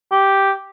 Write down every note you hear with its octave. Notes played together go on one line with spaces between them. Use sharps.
G4